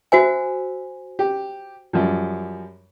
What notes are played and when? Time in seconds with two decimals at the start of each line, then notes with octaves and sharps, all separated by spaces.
0.12 F#4 C5 E5 G#5
1.19 G4
1.93 F#2 F3 G3